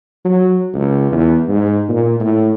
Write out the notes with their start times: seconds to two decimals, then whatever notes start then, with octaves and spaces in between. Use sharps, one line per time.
0.24 F#3
0.74 C#2
1.12 E2
1.48 G#2
1.89 A#2
2.20 A2